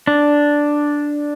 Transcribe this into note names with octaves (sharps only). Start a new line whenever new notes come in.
D4